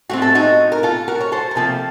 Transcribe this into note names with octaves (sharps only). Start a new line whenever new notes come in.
A2 A3 C4 F#4
A4
D#4 F#4
A#4
F4 A4
F#4 A#4
C#5
A4 C5
A#4
C3 F3 A#3 F4 A4